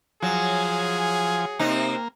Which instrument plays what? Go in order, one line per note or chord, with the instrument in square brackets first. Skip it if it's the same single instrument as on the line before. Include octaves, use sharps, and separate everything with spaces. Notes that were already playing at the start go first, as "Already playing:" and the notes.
[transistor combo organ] F3 G#5 [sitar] F#3 [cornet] G#4
[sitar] C3 C4 D#4 [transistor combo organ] A#3